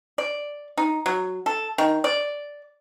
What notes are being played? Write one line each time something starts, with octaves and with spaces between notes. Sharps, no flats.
D5
D#4
F#3
A4
D#3
D5